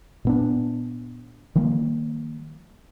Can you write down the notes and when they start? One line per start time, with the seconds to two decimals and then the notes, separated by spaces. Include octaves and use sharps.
0.25 A#2 B3 D4
1.55 D#3 F3 G3 A#3